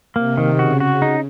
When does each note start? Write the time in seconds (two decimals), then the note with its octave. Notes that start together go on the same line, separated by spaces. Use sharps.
0.16 C3 A#3
0.37 D#3
0.59 C#3 F#4
0.80 F#4
1.02 D#4